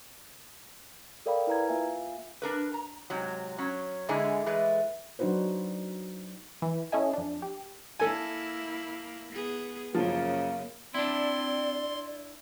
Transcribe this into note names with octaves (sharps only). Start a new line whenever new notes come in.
A4 A#4 D5 F5 G5 B5
E4 B4 A#5 G#6
A#3 F4 E5 F5 G#5
D4 A#4 B4
A#5
G#2 C3 F#3
F#3 C#4
G#2 D3 G#3 D4 E4 G#5
E3 G#3 A3 B4
F#3 D4 D#4 F#4 B4 C5
E3
C#4 E4 A4 D#5 E5 G#5
F2 D4
G4
A#3 E4 A4 G#5
B3 G#4
F#2 C#3 F3 A#3
C4 D4 E4 D5 C6